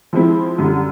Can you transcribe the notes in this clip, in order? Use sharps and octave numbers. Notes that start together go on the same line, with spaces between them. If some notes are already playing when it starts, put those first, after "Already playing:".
F3 G#3 C4 E4
F#2 D3 G3